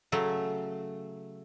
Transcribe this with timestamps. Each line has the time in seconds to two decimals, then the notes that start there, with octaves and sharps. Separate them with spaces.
0.12 C#3 F#3 A3